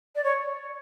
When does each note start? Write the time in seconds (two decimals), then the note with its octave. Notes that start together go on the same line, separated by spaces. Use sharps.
0.15 D5
0.24 C#5